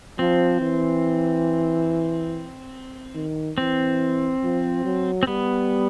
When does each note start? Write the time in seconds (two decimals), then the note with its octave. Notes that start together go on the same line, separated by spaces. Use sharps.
0.19 F3 C4
0.62 E3
3.15 D#3
3.58 E3 C4
4.43 F3
4.85 F#3
5.23 C4
5.27 G3 B3